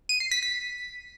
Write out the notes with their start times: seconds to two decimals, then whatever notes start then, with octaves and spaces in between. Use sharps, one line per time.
0.09 D#7
0.20 C7
0.31 B6
0.43 B6